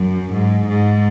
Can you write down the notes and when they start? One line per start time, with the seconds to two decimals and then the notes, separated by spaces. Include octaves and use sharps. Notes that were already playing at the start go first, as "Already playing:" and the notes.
Already playing: F#2
0.34 G#2
0.68 G#2